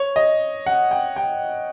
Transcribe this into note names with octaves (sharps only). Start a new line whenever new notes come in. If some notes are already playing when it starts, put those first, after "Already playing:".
Already playing: C#5
D#5
F#5
G5
G5